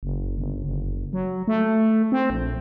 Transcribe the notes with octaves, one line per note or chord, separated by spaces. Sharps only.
F#1
G1
F#1
F#3
A3
C4
A#1